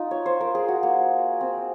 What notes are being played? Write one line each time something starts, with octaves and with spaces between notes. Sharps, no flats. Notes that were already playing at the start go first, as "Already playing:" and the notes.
Already playing: D#4 F4
C#5
C5
A#4
G#4
F#4
A#3
C4